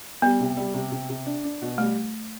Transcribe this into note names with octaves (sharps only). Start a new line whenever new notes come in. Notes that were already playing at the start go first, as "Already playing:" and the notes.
G3 B3
C3
G3
C3
C3
C3
D4
D4
B2
G3 A3